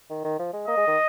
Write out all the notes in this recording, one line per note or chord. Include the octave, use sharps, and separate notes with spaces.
D#3
D#3
F3
G#3
A#3 D#5
G#3
D#3